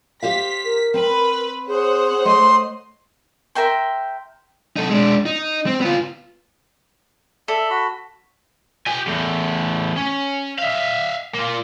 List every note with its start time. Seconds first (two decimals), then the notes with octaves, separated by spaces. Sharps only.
0.23 G4 C5 F5 B6
0.65 A#4
0.94 C4 B4
1.68 G#4 C5 C#5 F#5
2.25 A3 D#5 C6
3.55 A#4 E5 G5 C6
4.76 D#4 A4
4.90 G#3 D4
5.26 D#4
5.66 C4
5.81 B3 F4
7.48 A4 D5 E5
7.70 F#4 B5
8.87 G4 G#5
9.07 E2 A2
9.97 C#4
10.59 E5 F5
11.34 A#3 F4